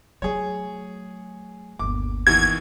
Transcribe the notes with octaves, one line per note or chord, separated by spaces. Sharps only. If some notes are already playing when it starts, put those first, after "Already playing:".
F#3 A3 G#4 C#5
G1 D#2 D6
B2 D#3 E3 G#6